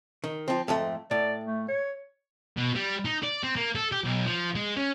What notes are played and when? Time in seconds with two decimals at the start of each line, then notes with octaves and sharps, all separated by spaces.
0.24 D#3
0.48 F3 C4
0.68 F2 G#2 A3
1.11 A2 D5
1.45 A3
1.68 C#5
2.57 B2
2.75 G3
3.05 D#4
3.23 D5
3.43 C4
3.56 A#3
3.75 A4
3.92 G4
4.05 B1
4.26 F3
4.55 G#3
4.76 C#4